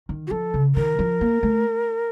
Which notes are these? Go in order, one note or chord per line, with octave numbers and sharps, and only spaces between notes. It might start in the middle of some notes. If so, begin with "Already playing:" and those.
D#3
F#4
F3 A4
C#3
D#3 A#4
F3
A#3
A3